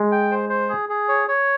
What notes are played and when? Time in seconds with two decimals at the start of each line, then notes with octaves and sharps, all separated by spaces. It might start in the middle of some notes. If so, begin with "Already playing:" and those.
Already playing: G#3
0.12 G5
0.31 C5
0.49 C5
0.69 G#4
0.89 G#4
1.09 C#5
1.28 C#5